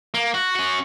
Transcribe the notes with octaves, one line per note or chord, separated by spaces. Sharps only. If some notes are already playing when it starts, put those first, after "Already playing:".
A#3
F#4
C#4 F#4